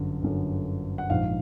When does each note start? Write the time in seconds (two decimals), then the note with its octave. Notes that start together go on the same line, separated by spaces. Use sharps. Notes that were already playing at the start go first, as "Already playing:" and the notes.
Already playing: G1 F#2 D3
0.22 G1 F#2 D3
0.98 F#5
1.10 A#1 G#2 F3 F5